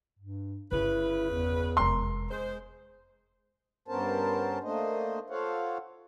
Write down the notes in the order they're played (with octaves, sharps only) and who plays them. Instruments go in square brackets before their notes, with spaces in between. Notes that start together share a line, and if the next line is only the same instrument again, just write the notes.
[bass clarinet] G2
[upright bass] G1 [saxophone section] C#3 B4 [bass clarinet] E4
[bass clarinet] E2
[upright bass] F1 G#3 [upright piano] A#4 C6
[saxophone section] G#3 C5
[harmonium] G2 B3 C#4 A#4 C5 A5
A3 A#3 D4 C5 D#5
F4 A4 C5 C#5 F5 F#5